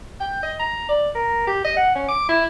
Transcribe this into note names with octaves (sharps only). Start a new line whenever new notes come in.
G5
D#5
A#5
D5
A#4
G4
D#5
F#5
C#4
D6
E4